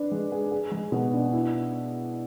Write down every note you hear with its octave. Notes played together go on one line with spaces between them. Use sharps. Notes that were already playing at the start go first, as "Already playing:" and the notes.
Already playing: D4 B4
G#3
G#4
G#4
G#3
B2
D4
E4